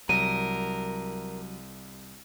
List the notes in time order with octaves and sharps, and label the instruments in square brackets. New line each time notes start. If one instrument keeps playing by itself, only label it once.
[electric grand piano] C2 [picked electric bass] F#3 [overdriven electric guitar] A#4 [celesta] D#7